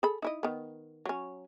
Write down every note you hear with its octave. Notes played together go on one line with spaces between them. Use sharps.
G#4 A4 B5
D#4 E4 D#5
D#3 B3
F#3 C#4